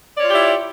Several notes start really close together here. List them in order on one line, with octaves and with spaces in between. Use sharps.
D5 C#5 F4 G4 E4